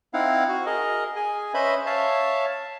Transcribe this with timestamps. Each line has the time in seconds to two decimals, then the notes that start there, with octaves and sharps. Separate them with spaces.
0.14 C4 D#4 E4 F5 F#5
0.49 F#4
0.66 G#4 A#4 D#5
1.16 G#4 G#5
1.54 C#4 B4 C5 D#5 E5 B5
1.86 C#5 E5 F5 A5